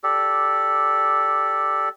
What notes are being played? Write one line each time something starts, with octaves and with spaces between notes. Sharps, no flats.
G4 A4 D5